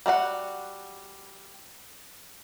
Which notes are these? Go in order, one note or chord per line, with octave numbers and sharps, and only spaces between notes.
G3 F#4 A4 F#5